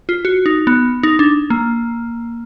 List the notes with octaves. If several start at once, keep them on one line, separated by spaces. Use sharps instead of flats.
F4
F#4
D#4
B3
D#4
D4
A#3